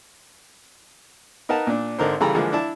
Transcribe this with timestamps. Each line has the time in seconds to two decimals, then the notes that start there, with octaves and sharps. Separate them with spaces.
1.49 D#4 A#4 B4 F#5 A5
1.67 A#2 D4
1.99 G#1 D3 D#4 A#4 C5
2.21 C#3 E3 G3 A4 A#5 B5
2.35 D3 E3 F3 G#3 A#3
2.52 D4 E4 D5 A5